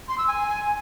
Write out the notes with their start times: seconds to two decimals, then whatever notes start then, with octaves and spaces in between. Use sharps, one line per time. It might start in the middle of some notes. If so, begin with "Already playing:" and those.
0.08 C6
0.18 E6
0.28 G#5